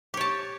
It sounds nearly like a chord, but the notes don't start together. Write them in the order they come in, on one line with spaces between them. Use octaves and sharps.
G4 C#5 A5